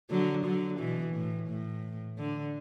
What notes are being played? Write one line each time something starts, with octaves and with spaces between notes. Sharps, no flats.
D3 F#3
D3 F#3
B2 E3
A2
A2
D3